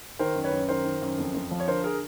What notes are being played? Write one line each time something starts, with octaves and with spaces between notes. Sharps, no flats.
D#3 A#4 C5
F#2
B4 C#5
F#2
D#3 A#4 C5
D#3
F#2
F2
F2
F3
C#5
D3 A#4 C5
G#4 A#4